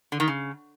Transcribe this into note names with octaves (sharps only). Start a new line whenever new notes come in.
D3
D#3
C#3